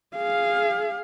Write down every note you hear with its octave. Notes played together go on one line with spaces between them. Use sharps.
G#4 F5